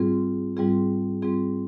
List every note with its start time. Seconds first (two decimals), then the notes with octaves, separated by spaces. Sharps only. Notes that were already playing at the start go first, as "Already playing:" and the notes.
Already playing: G#2 G3 C4 F4 G#4
0.57 G#2 G3 C4 F4 G#4
1.22 G#2 G3 C4 F4 G#4